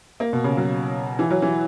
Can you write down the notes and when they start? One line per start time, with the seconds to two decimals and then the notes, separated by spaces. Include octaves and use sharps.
0.20 A#3
0.33 B2
0.44 C#3
0.57 F#3
1.19 E3
1.30 F#3
1.42 E3